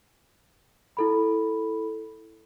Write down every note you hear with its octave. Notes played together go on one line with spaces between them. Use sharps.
E4 A4 B5